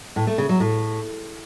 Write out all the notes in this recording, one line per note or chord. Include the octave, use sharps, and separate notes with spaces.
A2
A3
C#3
F#3
A2